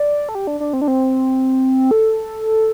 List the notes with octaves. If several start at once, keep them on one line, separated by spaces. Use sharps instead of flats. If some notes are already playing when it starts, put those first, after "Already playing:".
Already playing: D5
A4
G4
D4
D4
C4
D4
C4
A4